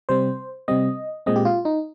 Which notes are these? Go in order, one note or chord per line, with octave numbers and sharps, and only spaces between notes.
C3 G3 C4 C5
C3 G3 C4 D#5
A#2 G#3 C4 D#5
G4
F4
D#4